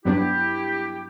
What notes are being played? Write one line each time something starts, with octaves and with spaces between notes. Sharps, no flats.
G2 F#3 B3 D4 E4 G4